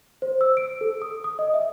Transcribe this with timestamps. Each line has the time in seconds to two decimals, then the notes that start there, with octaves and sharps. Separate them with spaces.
0.22 C5
0.41 E6
0.57 D7
0.81 A4
1.02 D#6
1.24 D#6
1.39 D#5
1.54 E5